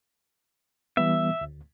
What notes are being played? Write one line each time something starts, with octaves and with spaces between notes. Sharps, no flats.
E3 G3 B3 E5
D2